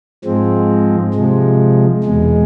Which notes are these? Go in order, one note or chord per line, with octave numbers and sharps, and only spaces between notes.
G#2 F3 G#3 C4
C3 F3 G#3
E2 B2 G#3